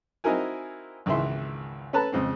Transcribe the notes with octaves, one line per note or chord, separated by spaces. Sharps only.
C4 D#4 E4 F#4 A#4 G#5
G#1 C#2 C#3 E3 E5 C6
C#4 A4 B4 A5 A#5
F2 C#3 G#3 C4